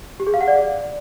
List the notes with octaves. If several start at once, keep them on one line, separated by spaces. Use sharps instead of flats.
G4
G#4
F5
F#5
D5